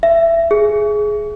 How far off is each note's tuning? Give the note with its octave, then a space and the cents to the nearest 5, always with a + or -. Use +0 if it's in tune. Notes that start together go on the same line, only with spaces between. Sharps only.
E5 +20
G#4 +15